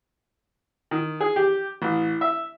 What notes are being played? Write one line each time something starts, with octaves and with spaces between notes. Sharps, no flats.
D#3
G#4
G4
A1
E5